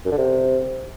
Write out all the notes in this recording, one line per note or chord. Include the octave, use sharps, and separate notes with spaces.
F#2
D3
C3